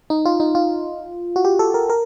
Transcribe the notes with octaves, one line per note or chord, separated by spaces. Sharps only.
D#4
F4
D#4
F4
F#4
G4
A4
A#4
A#4